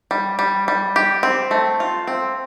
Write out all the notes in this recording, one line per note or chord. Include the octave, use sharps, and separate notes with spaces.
G3
G3
G3
G4
C4
A3
F4
C4